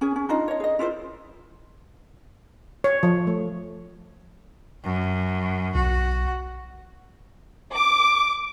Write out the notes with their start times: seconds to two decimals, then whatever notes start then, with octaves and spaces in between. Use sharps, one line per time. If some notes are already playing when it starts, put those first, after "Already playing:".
0.01 C#4 G#4
0.16 C#4
0.29 D4 D#4 F4 D#5
0.48 C#5 D#5
0.60 G#4 D#5
0.79 E4 F4 G#4 C5
2.84 C#5
3.03 F3
3.27 A3
4.84 F#2
5.75 B1 F#4
7.74 D6